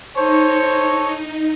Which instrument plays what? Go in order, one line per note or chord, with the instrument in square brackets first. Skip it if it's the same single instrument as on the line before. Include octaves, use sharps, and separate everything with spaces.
[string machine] D#4 [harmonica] A4 C#5 C#6 [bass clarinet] C5